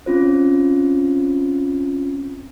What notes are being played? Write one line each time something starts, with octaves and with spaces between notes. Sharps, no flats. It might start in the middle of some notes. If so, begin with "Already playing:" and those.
C4 C#4 F4 C5